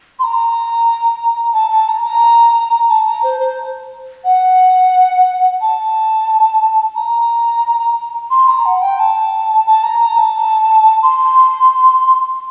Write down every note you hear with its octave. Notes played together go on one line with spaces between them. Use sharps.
C6
A#5
A5
A5
A#5
A#5
A5
A#5
C5
C5
F#5
A5
A#5
C6
A#5
F#5
G5
A5
A5
A#5
A#5
A5
C6